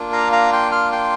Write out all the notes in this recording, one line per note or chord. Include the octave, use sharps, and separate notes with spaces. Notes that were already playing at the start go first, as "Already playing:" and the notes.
Already playing: A#3 D4 F4
F5 A#5
F5 A#5
G5 C6
C6 F6
G5 C6